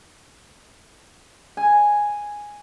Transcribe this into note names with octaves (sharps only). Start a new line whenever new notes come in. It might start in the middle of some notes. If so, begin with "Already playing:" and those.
G#5